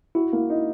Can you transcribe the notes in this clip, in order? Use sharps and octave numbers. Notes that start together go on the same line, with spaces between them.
E4 F#4
A#3
D#4